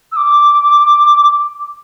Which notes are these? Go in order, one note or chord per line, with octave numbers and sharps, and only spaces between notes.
E6
D6